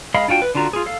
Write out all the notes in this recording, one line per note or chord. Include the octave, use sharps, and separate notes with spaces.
G#3 D#5 F5 B5
D4 F4 F#4 G5
B4
D3 D4 F4 F#4 A#5
F4 G#4
A4 F5